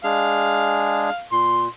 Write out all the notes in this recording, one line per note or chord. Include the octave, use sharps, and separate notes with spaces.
G#3 D4 G#4 F5
A#2 C6